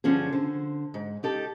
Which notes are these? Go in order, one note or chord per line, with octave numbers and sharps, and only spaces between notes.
G2 D3 F3 C#4 F4 G#4
D3 C5
G#2
D#4 G4 A4